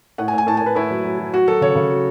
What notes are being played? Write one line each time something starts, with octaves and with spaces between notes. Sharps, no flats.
A2 F#5
G#5
A2
G#5
A2 A5
G#5
A2
B4
A2 E4
F#3
F#3
F#3
F#3 F#4
F#3 A4
C#3 C#5
C#3
F#3